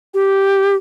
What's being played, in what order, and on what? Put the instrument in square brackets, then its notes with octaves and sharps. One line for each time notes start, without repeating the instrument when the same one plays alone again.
[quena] G4